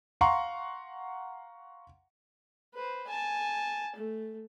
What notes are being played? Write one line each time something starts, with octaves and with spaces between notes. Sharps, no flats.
F5 F#5 A#5 C6 C#6
B4 C5
G#5 A5
A3